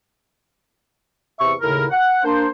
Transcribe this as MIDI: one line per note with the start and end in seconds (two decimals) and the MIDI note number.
1.39 1.53 40
1.39 1.53 48
1.39 1.53 76
1.39 1.53 85
1.62 1.84 39
1.62 1.84 45
1.62 1.84 49
1.62 1.84 64
1.62 1.84 70
1.91 2.22 78
2.23 2.47 58
2.23 2.47 62
2.23 2.47 72